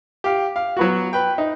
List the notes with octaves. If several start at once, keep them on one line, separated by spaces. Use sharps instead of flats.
G4 F5
F5
F#3 B3 F#4
B4 G5
D#4